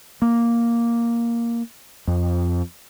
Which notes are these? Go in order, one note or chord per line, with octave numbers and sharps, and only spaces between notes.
A#3
F2